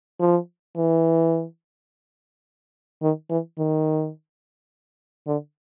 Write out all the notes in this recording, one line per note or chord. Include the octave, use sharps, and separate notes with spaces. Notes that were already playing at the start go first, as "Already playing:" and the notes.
F3
E3
D#3
E3
D#3
D3